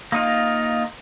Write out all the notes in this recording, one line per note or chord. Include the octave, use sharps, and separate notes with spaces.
A#3 D#4 F4